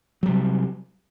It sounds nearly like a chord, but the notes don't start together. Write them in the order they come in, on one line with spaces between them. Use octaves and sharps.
F#3 G3 C3